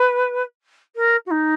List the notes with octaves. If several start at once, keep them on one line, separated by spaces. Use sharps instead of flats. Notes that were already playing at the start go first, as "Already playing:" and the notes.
Already playing: B4
A#4
F#4
D#4